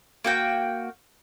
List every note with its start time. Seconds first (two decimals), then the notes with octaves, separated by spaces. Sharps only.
0.24 A#3 F#4 G5